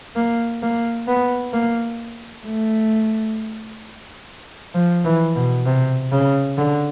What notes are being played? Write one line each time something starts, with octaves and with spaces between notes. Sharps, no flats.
A#3
A#3
B3
A#3
A3
F3
E3
B2
C3
C#3
D3